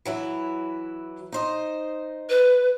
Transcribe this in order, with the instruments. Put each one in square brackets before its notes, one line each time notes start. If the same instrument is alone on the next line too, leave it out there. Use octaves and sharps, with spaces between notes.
[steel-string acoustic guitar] E3 F#3 E4
D#4 C5 D#5
[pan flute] B4